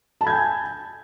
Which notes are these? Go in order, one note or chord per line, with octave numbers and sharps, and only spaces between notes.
G#5 A5 B5 G6 G#6